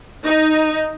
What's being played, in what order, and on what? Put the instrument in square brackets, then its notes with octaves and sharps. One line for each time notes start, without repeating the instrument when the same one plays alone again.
[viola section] D#4